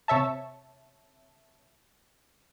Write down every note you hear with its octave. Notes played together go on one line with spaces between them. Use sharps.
C3 C#5 E5 A5